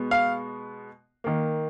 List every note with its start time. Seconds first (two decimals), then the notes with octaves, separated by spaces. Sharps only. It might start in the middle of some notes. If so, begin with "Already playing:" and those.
Already playing: B2 G#3 B3
0.11 F5
1.24 D#3 A#3